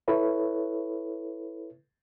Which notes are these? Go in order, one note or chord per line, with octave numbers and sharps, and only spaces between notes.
E4 A4 B4 C#5